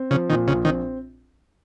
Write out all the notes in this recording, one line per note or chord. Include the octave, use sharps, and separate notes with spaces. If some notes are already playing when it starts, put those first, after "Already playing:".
Already playing: C4
C#3 F3
A#2 D#3
A#1 C#3
D#3 C4